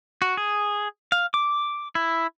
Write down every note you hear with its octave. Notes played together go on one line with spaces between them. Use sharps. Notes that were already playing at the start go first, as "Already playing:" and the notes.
F#4
G#4
F5
D6
E4